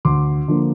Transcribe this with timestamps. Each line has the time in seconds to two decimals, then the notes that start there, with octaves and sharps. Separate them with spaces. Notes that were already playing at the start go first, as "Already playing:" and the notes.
0.05 D2 C6 D6
0.48 D3 F3 A#3